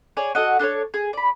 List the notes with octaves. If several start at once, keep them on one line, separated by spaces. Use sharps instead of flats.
G#4 C#5 D5
F#4 A4 D#5 F#5
D4 A4 C5 C#5
G#4
D5 B5